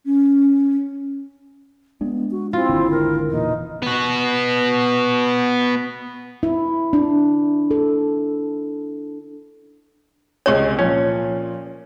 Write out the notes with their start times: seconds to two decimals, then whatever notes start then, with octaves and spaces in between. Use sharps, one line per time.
0.06 C#4
2.01 G#3 B3 D4
2.31 F#4
2.53 C4 E4 F4
2.69 G#1 D#2 D3
2.90 A#4
3.29 E1 A#2 E3 D#4
3.82 B3 F#4
6.43 E4
6.93 D4
7.71 A4
10.46 C#2 C3 C#5 G#5
10.79 A#2 F3 C#4